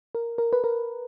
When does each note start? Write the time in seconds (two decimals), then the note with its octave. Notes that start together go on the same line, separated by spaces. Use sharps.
0.15 A#4
0.38 A#4
0.53 B4
0.64 A#4